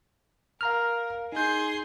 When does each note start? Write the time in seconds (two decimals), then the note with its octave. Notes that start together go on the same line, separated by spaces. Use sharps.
0.61 A#4 F5 A#5 F6
1.32 D#4 G#4 C6 G6